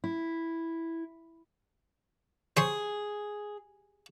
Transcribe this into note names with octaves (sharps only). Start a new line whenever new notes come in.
E4
G#4 C5 C#5 C6